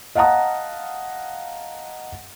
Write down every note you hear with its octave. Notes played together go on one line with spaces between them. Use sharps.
D#5 F5 F#5 A5 A#5 D#6